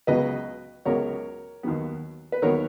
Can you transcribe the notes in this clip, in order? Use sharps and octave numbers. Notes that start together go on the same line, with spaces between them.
C#2 C#3 F#3 B3 B4 D#5
C#2 C#3 F#3 B3 A#4 C#5
D#2 D#3 F#3 B3
B4
D#2 D#3 F#3 B3 A#4 C#5